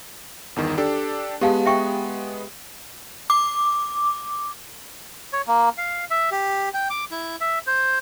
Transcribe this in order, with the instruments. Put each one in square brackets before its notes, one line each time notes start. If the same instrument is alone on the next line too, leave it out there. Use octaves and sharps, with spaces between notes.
[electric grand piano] G1 E2 D#3
D4 G4 A4
[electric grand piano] G#3 B3 [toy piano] G4 F5 A5
[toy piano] E5 G5 C#6
[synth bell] D6
[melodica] C#5
A#3
F5
E5
G4
G5
D6
E4
E5
C5